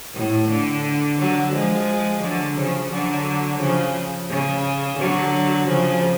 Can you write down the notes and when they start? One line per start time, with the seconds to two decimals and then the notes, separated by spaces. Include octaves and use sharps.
0.15 A2
0.50 D3
1.18 D3 F#3
1.53 F3 G#3
2.22 D3 F#3
2.56 C#3 F3
2.91 D3 F#3
3.60 C#3 F3
4.29 C#3
4.98 D3 F#3
5.67 C#3 F3